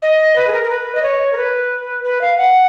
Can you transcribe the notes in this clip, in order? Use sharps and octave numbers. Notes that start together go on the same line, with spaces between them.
D#5
B4
G#4
A#4
A#4
B4
D#5
C#5
A#4
B4
B4
F5
F#5